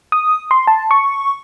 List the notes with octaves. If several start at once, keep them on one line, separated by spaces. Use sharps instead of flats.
D#6
C6
A5
C#6